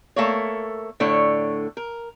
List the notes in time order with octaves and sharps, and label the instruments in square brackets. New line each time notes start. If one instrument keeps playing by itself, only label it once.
[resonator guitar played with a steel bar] A3 A#3 C#5
A2 D3 A3 C#5
A#4